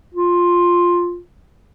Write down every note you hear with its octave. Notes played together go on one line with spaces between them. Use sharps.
F4